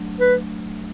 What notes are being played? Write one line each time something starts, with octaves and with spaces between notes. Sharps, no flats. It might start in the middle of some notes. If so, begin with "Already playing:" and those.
Already playing: F#3 A3 D4
F#3 A3 D4 B4